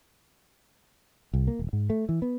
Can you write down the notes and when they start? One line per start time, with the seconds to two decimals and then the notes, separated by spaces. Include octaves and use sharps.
1.33 C2
1.47 A#3
1.59 D#1
1.73 G#2
1.90 A3
2.09 E3
2.22 B3